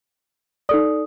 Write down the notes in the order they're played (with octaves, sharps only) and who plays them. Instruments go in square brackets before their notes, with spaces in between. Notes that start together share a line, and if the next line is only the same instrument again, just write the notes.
[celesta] D#4 A4 D5 D#6